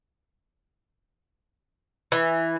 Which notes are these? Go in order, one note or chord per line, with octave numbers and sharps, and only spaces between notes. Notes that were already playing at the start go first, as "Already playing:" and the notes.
E3